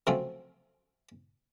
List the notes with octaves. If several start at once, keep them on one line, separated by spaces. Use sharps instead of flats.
C3 F3 F#3 A3 C4 C#4